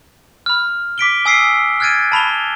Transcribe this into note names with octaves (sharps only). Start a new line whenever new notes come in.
B5 F6
D6 B6 D7 G7
G#5 D#6 E6 B6 C7 D7
F6 F#6 G#6 A6 D7 D#7
A5 B5 F7 G7